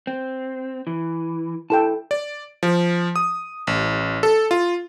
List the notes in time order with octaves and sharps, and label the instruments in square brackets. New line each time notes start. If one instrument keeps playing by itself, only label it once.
[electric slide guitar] C4
E3
[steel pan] E4 A4 G5 [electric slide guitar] A5
[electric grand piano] D5
F3
D#6
A1
A4
F4